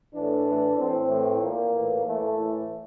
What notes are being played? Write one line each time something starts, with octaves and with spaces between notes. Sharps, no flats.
A2 E3 D4
A2 E3
A2 E3 C4
A2 E3
A#2 A#3
A2 E3
A2 E3 A3
A2 E3